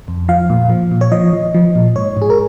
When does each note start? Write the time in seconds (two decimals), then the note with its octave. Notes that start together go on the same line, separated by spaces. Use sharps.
0.08 F2
0.28 F3 F5
0.50 A#2
0.70 F3
0.91 A#2
1.01 C#5
1.12 F3 D#5
1.33 F3
1.54 F3
1.75 A#2
1.96 G#2 C#5
2.17 G#2 G#4
2.30 A#4